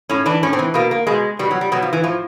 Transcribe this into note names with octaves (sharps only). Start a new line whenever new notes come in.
A2 C#4
E3 D4
A2 C#4
C4
E3
B2 A#3
A#3
B2 G#3
B2 G3
F#3
G3
B2 F#3
F3
E3
A2 F3